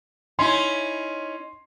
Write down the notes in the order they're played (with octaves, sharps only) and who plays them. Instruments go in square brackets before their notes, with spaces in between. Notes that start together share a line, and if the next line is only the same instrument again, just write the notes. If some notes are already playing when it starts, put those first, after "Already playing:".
[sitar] C#4 D#4 E4 [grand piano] C6